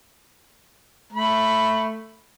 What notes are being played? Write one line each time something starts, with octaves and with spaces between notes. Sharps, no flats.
A3 B5